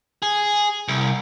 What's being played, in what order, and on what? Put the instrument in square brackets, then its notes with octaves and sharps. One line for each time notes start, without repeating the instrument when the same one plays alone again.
[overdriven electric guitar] G#4
C2